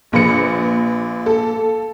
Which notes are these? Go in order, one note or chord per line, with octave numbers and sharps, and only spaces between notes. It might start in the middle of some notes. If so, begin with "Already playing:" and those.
A#1 A#3 B4 C#7
A4